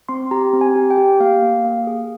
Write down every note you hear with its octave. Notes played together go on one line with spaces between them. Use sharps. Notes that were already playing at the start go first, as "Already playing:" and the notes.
C4 C6
G4 A#5
C4
G#5
G4
G5
G4
A#3 F5
A#3
A#3
G#4